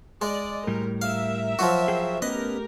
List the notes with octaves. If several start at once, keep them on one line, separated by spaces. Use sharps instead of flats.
G#3 D5 D#5
A2 G3 A#4
A#4 E5 F5
F3 F#3 F#4
G#4 F5 G5
A3 B3 C#4 G4 A#4 B4 D#5